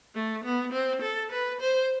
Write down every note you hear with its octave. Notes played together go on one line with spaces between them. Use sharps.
A3
B3
C4
A4
B4
C5